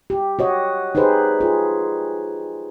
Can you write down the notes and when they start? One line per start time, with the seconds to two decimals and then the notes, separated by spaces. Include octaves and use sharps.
0.10 G4
0.39 F#4 C#5 D#5
0.95 D#4 G4 G#4 B4 C5
1.40 F4 G#4